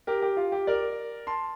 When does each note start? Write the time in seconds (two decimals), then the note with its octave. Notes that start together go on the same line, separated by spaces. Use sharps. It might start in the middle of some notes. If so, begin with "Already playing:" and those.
0.07 G4 A#4
0.22 G4
0.37 F4
0.52 G4
0.67 A#4 D5
1.27 A5 C6